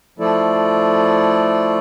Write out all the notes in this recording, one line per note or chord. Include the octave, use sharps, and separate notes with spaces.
F3 A3 E4 A4 D5